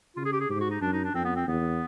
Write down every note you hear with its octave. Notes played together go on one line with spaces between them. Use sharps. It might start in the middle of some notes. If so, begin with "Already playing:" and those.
C#3 F4
G#4
G4
G#4
G#2 G4
F#4
D#4
F#2 D4
D#4
D4
F2 C4
B3
C4
E2 B3